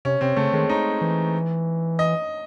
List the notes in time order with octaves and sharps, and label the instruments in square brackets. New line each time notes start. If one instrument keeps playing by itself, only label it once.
[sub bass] C3 [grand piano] C#4
[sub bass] C3 [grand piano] C4
[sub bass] C#3 [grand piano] A3
[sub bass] D#3 [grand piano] G#3
[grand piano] D#4
[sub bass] E3
[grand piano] D#5